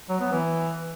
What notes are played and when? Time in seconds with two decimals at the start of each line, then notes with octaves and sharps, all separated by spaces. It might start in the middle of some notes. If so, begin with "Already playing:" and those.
0.09 F#3
0.20 B3
0.32 E3